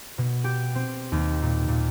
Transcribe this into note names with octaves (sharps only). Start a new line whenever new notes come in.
B2
G4
C4
D#2
A#2
A#2